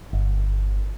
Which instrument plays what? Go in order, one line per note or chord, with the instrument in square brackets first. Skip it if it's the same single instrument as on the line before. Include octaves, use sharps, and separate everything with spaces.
[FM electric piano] G1